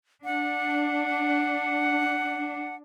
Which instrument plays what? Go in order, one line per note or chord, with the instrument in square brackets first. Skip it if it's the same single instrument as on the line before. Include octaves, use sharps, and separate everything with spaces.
[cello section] D4 [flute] F#5